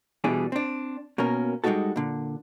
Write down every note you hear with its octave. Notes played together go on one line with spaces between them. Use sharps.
B2 E3 G3 D4 G#4
C4 D4
B2 A#3 C#4 A#4
G3 G#3 B3 D#4 F#4 A4
A#2 D3